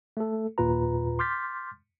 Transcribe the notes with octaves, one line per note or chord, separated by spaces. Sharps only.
A3 A4
D#2 A#2 F4 B4 A#5
C6 D6 F6 G6 A6 B6